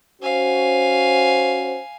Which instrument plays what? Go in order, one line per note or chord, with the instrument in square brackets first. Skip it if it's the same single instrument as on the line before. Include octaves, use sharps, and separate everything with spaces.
[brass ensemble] C#4 F#4 C5 [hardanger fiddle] F5 G#5